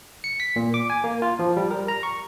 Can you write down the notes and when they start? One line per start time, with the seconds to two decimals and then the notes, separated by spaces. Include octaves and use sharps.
0.24 C#7
0.40 B6
0.56 A#2
0.74 D6
0.90 G#5
1.04 A#3
1.22 F4
1.39 F3
1.57 G3
1.71 A#4
1.88 A#5
2.03 C#6